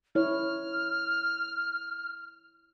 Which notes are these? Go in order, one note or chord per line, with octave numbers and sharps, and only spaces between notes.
E4 C#5 F6